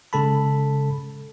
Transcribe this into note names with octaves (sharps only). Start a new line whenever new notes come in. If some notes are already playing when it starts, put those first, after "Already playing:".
C#3 G#3 A4 A5 B5